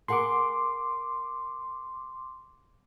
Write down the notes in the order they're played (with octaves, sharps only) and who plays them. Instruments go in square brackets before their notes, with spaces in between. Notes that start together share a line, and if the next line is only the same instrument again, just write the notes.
[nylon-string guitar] G#4 A#4 F#5 [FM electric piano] C6 D6